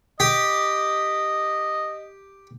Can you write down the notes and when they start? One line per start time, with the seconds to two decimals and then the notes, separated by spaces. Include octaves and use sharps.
0.20 G4 D#5